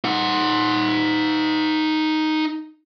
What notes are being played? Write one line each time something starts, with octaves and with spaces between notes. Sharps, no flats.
D#4 F#5